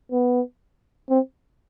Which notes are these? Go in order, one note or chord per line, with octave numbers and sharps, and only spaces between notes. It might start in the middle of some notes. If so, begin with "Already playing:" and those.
B3
C4